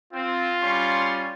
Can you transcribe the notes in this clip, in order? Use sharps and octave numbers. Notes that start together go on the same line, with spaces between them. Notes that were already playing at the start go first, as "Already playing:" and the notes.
C4 F4
G3 C#4 C6